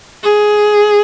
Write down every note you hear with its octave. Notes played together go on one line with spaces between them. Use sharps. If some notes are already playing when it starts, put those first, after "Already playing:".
G#4